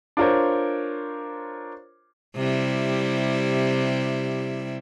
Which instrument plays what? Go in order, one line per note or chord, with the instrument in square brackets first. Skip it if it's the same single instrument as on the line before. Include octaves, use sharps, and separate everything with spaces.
[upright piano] D4 F4 A#4 C5 C#5
[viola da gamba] C3 G3 E4